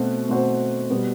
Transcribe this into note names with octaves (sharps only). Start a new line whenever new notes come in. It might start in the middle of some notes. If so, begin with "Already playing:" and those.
Already playing: B2 A3 C4 F#4 C5
B2 A3 C4 F#4 C5
B2 G3 B3